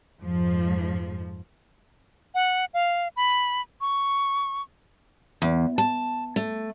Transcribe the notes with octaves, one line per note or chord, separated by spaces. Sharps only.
F2 G#2 F3
F#5
F5
B5
C#6
E2
A5
A3